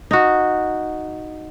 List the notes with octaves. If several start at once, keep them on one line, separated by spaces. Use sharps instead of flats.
D#4 F#4